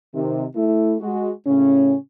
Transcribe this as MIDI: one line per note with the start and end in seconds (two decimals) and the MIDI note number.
0.14 0.45 48
0.14 0.45 51
0.54 0.95 57
0.54 0.95 64
1.00 1.30 56
1.00 1.30 66
1.46 1.94 45
1.46 1.94 49
1.46 1.94 61